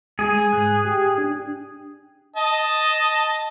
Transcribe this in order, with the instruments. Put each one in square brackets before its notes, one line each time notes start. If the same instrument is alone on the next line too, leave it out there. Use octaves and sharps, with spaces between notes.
[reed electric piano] G#3 [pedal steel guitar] G#4
[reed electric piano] G#2 F#6
G4 G5
D4
[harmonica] D#5 A5